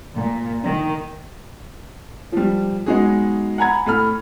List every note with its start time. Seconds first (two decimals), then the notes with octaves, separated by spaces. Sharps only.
0.17 A#2
0.63 D#3
2.32 F3 G3
2.86 F#3 G#3 B3 D#4 F#4 G#4
3.58 F#5 G#5 A#5 B5 G#6
3.86 A2 A4 B5 F6